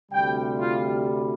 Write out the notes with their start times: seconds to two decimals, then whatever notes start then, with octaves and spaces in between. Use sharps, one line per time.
0.12 D2 C3 G3 G5
0.59 F4